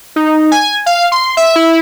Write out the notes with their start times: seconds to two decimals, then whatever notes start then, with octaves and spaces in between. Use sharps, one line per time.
0.16 D#4
0.51 G#5
0.86 F5
1.12 C6
1.37 E5
1.56 E4